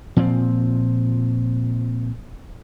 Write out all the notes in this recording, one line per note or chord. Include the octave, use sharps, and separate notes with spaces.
A#2 F3 C4